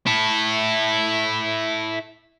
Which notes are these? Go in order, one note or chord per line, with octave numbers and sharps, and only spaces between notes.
E4 A4